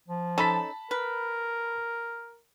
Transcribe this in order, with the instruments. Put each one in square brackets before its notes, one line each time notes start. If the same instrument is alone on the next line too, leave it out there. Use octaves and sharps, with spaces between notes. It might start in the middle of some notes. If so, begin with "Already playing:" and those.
[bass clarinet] F3
[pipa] C#4 D#4 A4 [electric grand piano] A5 B5 B6
[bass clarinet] A#4 [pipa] B4